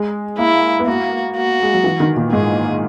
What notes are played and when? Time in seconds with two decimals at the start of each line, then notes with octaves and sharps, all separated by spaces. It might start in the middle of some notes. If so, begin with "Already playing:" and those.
Already playing: G#3
0.38 A#3 E4
0.80 B3
0.87 A#3 F#4
1.36 F#4
1.63 G#3
1.74 F#3
1.84 E3
2.00 D#3
2.16 A#2
2.33 G#2 G#4